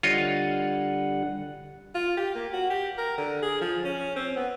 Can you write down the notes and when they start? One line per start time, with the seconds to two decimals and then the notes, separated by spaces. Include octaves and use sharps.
0.03 D3 G3 F4 C#5 D#5 F#5
1.95 F4
2.17 G4
2.35 A#3
2.53 F#4
2.70 G4
2.98 A#4
3.18 D3
3.42 G#4
3.61 F3
3.84 C#4
4.16 C4
4.36 B3